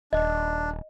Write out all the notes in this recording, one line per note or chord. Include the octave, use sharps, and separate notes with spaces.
D#1 D4 D#5